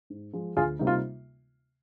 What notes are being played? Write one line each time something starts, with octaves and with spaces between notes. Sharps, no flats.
G#2
F3 G#3
D2 F4 G#4
C3 G3 A#3 D#4
F4